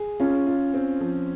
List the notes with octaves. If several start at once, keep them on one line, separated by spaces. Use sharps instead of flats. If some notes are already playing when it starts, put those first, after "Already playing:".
Already playing: G#4
C#4 F4
F4
C4
F3